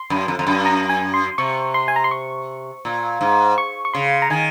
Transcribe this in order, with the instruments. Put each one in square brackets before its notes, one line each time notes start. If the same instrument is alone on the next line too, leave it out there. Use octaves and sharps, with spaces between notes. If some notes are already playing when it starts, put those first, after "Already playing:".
Already playing: [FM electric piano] C6
[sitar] F#2
F2
F2
F#2
[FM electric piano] A#5
G#5
C6
[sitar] C3 [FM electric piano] C#6
[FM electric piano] C6
G#5
A#5
C6
C#6
[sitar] A#2
G#2
[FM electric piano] C#6
C#6
[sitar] C#3 [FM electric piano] C6
[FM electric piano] A#5
[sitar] D#3 [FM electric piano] G#5